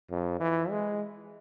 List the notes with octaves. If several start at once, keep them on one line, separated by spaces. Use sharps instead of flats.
F2
E3
G#3